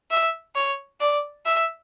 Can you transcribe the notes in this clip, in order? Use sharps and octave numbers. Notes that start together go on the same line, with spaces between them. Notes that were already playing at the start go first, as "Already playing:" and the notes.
E5
C#5
D5
E5